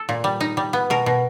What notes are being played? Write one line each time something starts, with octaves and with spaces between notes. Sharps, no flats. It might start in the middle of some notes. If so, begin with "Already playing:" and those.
Already playing: A4
A#2
G3
D#4
G3
B3
B2 A#4
B2